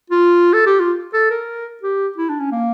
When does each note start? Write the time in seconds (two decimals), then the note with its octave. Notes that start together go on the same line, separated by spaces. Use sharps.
0.10 F4
0.53 A4
0.66 G4
0.80 F4
1.14 A4
1.31 A#4
1.83 G4
2.18 E4
2.29 D4
2.40 C#4
2.52 A#3